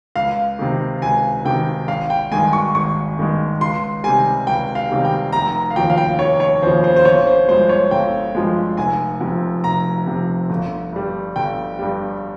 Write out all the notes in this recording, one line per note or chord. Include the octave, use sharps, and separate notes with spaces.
C#2 F5
C3 D#3
C#2 G#5
C3 D#3 G5
G#1 F5
G5
G2 D#3 G#3 G#5
C#6
G#1 C#6
G2 D#3 G#3
C#2 C6
C3 D#3 G3 G#5
C#2 G5
F5
C3 D#3 G3
G5
F1 A#5
A#5
F5
D#2 C#3 F3 G5
F5
G5
F1 C#5
C#5
D#2 C#3 F3 C5
C5
C5
G1 C#5
C5
G2 F3 G#3 C5
C#5
G1 G5
G2 F3 G#3
F1 G#5
F2 C3
F1 A#5
F2 C3
G1
G2 G3
G1 G5
G2 G3